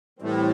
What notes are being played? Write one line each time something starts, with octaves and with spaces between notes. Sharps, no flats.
A2 E3 G3 C4